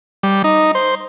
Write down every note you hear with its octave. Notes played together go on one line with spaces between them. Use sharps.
G3
D#4
C5